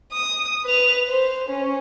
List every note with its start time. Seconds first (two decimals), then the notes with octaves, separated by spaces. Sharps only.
0.13 D#6
0.65 B4 F7
1.09 C5
1.49 C#4